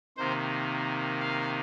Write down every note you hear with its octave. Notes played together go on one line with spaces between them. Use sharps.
C3 D#3 A#3 C5
F5